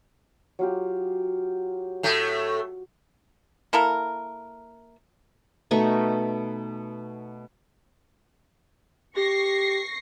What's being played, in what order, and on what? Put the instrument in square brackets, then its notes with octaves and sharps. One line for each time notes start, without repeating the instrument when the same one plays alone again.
[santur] F#3 F4 G4
[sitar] A2 A3
[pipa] A#3 E4 A4 A#4
[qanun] B2 A3 D#4 C#6
[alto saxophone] G4 [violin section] C#6 A#6 C7